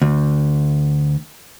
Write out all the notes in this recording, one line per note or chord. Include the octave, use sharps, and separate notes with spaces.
D2